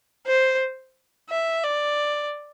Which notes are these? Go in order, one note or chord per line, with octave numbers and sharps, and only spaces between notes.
C5
E5
D5